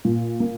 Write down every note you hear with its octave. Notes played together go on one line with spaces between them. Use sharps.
A#2
A#3